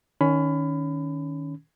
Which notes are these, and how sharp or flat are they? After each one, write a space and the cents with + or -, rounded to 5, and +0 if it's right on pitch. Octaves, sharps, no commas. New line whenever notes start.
D#3 +0 C#4 +15 B5 +25